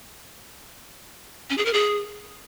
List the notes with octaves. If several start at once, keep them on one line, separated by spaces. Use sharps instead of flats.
C#4
G#4
A#4
G#4